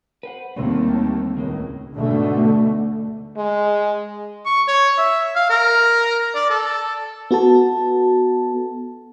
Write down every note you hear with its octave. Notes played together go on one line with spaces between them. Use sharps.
B4 C5 F#5
D#2 D3 G3 A3 C4
C#2 A2 D#3 G#3 A#3
D2 G#2 B2 D3 A3
G#3
C#6
C#5
E5
F5
A#4
D5
A4
B3 F#4 A4 A5